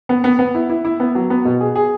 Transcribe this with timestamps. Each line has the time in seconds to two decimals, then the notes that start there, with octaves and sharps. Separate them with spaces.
0.09 B3
0.24 B3
0.39 B3
0.55 E4
0.69 E4
0.85 E4
1.00 B3
1.15 F#3
1.30 B3
1.45 B2
1.61 G#4
1.75 G#4